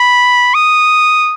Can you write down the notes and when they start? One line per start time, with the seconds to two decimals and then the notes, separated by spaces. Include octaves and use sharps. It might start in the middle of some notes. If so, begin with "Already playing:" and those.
Already playing: B5
0.54 D#6